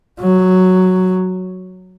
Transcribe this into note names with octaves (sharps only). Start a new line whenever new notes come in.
F#3